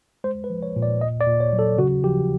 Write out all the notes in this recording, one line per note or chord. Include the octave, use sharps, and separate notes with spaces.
G#3 C5
B4
F3
C#5
A#2
D5
A#2 D#5
D5
A#2
C#5
F#3
A4
C#3 F#4
F3 G4